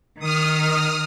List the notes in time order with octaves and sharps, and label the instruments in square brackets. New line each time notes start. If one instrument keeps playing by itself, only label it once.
[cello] D#3 [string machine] D#6 F6